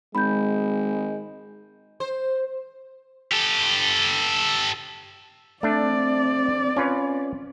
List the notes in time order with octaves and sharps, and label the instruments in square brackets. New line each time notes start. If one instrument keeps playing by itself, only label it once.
[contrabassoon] G#1 [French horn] G#3 [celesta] B5 G6
[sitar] C5
[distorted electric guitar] G4 A4
[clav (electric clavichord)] A3 D4 [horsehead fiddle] C4 D5
[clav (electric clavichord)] C#4 F4 B4